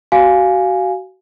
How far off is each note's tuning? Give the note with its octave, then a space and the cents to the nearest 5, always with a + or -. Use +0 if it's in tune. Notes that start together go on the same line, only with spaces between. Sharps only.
F#4 +30 F5 +0 G#5 +0